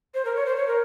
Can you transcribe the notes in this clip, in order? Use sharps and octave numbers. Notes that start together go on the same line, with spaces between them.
C5
A#4
C#5
C5
C#5
A#4